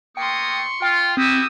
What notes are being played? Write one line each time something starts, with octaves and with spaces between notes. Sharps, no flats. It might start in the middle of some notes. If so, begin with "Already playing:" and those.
A3 A#3 G5 C6 C#6 D#6
F4 G5
C4 E4 F#4 G4 D#6 E6